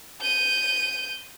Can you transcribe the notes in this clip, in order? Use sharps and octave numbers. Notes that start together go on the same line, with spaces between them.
G6 D#7